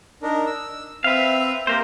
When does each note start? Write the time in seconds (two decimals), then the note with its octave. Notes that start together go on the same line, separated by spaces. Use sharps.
0.22 D4 D#4 A#4
0.46 E6
1.04 C4 B4 E5 F5
1.67 A#3 G4 A#4 C5